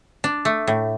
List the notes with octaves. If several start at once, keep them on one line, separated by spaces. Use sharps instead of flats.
D4
A3
A2